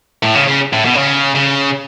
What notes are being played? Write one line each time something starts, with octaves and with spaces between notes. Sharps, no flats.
A2
C#3
C#3
A2
B2
D3
C#3
C#3